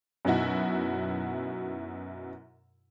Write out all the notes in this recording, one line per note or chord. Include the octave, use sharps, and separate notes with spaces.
F#2 B2 F#3 D#4 E4 F#4